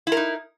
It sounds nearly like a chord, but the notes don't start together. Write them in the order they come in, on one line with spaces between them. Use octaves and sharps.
E4 A#4 D#4